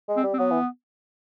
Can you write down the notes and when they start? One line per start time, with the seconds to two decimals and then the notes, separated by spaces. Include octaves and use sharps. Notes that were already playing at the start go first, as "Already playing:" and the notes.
0.08 G#3
0.17 C4
0.24 G3
0.34 C4
0.39 F#3 B3
0.51 E3